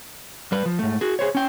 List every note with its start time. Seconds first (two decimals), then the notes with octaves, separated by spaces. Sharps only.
0.52 G3 B4
0.66 F3
0.79 G#2 A3
1.01 F#4 G#4
1.19 G#4 C5 C#5
1.35 C#4 G5